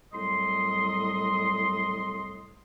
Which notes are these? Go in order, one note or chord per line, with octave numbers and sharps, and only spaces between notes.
C2 A2 F#3 G3 D#5 C6